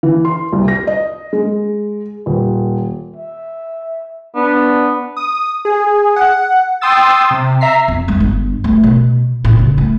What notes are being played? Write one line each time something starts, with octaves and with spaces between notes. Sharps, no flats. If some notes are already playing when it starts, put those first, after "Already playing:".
E3
C6
C2
A#6
D#5
G#3
D#1
E5
B3 D4
D#6
G#4
F#5
G5 C6 D#6 E6 A6
C3
E5 A#5 B6 C7
F2
G#3
G1
A3
B2
A2
C#3
A3